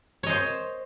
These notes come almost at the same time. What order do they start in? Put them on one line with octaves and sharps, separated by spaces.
C#5 D#5 C5